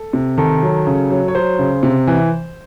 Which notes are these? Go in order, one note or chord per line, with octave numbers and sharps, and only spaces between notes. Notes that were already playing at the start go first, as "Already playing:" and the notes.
Already playing: A4
C3
D#3 A4
F#3
C#3
F#3
C#5
F#3 C5
C#3
C3
E3